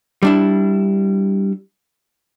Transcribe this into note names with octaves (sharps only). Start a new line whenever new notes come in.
G3 D4 E4